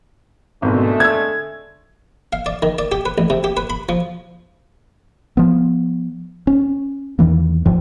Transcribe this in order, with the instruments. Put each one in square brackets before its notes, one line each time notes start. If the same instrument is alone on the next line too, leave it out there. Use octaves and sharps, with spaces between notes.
[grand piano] G#1 B2 [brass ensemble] D3 G#3 A3
[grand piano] E6 G#6
[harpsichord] F5
D5
D#3
D5
G4
B4
A1
C3
G4
B4
B5
F3
[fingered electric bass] F3 B3
C#4
E2 D#3 E3 A#3
A1 F#2 F3